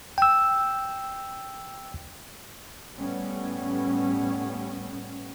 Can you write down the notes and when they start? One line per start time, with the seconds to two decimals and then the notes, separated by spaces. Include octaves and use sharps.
0.18 G5 E6
2.96 A2 G3 B3 C#4